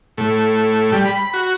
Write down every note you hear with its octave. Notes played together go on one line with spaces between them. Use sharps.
A2
G3
B5
F#4